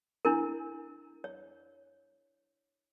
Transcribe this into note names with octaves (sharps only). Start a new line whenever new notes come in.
D4 E4 A#4
C#5